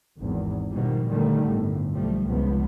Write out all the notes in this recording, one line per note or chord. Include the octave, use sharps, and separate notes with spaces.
G#1 E2
B2 D#3 F3 G3
A#2 D3 D#3 G3 A3
G1 A2
B1 F3 G3 A3
F1 C#2 F3 B3